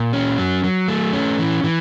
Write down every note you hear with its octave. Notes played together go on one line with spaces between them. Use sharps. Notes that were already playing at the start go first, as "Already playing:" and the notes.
Already playing: A#2
C#4
F#3
F#3
A3
C#4
E3
E3